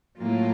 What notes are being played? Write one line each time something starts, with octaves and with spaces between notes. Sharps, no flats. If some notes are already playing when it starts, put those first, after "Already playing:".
A2 F#3 A#3 F4